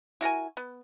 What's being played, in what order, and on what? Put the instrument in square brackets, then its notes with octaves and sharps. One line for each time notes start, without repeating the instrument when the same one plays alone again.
[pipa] E4 F#4 A#4 G#5
B3